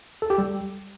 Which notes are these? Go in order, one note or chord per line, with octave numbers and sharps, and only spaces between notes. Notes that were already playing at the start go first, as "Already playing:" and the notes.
A4
G4
G3